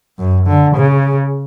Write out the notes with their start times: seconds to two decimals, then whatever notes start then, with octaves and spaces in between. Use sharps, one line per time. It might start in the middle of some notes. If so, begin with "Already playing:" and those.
0.19 F#2
0.47 D3
0.76 C#3